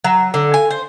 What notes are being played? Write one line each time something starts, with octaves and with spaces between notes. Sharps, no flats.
F#3
D3
G#5
C5